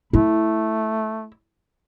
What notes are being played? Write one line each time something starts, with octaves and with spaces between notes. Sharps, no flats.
A3 E4